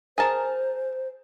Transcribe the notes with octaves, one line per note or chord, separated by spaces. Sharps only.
G#4 A#4 C5 A5